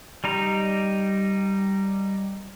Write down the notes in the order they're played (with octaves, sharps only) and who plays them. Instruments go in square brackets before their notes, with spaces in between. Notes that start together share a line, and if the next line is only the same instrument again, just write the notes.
[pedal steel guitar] G3 D#4 A#5